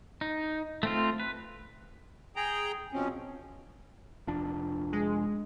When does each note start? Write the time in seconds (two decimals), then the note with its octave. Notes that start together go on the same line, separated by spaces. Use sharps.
0.21 D#4
0.83 A3 C4 F4
1.20 B4
2.36 G#4 G5 A#5
2.93 B2 F3 C4 C#4
4.27 F1 F3 D4
4.92 G#3